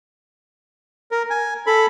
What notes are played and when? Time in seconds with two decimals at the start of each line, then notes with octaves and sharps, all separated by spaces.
1.11 A#4
1.30 G#5
1.66 A4 B5